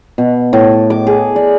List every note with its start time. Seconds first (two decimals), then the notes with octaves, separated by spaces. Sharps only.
0.18 B2
0.53 A2
0.90 D6
1.07 G#4
1.36 D5